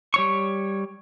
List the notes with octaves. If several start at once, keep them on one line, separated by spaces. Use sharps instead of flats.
G3 C#5 C#6